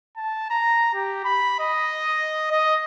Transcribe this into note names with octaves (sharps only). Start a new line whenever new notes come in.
A5
A#5
G4
B5
D#5
D#5